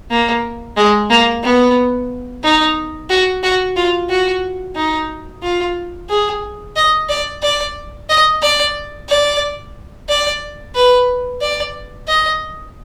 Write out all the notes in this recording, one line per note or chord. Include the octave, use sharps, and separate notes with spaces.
A#3
G#3
A#3
B3
D#4
F#4
F#4
F4
F#4
D#4
F4
G#4
D#5
D5
D5
D#5
D5
D5
D5
B4
D5
D#5